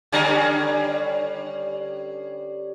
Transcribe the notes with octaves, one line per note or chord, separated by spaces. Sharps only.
D3 G3 C#4